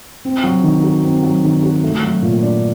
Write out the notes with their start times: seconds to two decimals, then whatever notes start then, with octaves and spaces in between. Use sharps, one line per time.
0.25 C4
0.44 F#3
0.63 D#3
0.84 F#4
1.04 C4
1.23 F#3
1.44 D#3
1.63 F#4
1.84 A3
2.03 F#3
2.22 A#2
2.42 D4